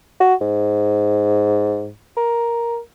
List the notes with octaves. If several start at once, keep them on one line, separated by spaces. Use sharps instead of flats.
F#4
G#2
A#4